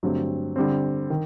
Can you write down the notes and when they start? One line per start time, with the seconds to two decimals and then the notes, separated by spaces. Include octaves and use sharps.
0.03 G2 D3 F#3 A3 C4
0.56 D3 G3 C4
1.10 D#3